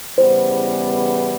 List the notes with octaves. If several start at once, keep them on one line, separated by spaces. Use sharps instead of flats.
E2 C#3 E3 G3 B3 C5